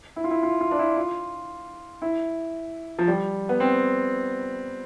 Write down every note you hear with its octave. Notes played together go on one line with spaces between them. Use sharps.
E4
F4
E4
F4
F4
D4
E4
F4
E4
F3
G3
B3
C4